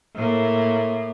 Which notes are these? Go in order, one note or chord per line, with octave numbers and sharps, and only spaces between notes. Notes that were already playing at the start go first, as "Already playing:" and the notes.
A2 A#3